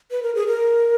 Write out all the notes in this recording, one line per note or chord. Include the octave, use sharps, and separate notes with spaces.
B4
A#4
G#4
A#4